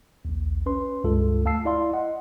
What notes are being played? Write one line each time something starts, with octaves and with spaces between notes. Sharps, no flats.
A#1 D#2
C#4 B4 C6
C#2 G2 G#3 F4 A4
D2 A3 F5 A5 E6 C7
E4 D5 F5 C6
D#5 F#5